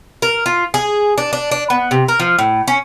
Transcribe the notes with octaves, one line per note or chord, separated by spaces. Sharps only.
A#4
F4
G#4
D4
D4
D4
B3
C3
A#4
F3
A2
C#4